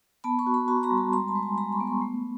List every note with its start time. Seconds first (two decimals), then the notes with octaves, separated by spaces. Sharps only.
0.24 B3 A5 B5
0.39 B5 C#6
0.46 F#4
0.54 B5 C#6
0.68 F#4 A#5 C6
0.83 A#5 C6
0.90 G3
0.98 A5 B5
1.13 G#3 A#5 C6
1.28 A5 B5
1.35 G#3
1.43 G#5 A#5
1.57 G#3 A#5 C6
1.72 B5 C#6
1.80 B3
1.87 B5 C#6
2.02 A3